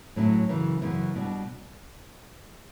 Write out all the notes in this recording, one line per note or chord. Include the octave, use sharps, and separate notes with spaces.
A2 F#3 C#4 E4
F#2 C#3 E3
F#2 C#3 E3
B2 G3 D4